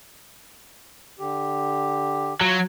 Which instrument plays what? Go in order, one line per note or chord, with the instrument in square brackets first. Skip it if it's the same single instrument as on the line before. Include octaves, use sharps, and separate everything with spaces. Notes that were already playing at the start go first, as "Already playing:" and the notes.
[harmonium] D3 G4
[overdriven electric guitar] F#3 [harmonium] F4